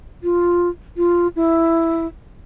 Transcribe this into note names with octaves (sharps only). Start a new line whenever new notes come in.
F4
F4
E4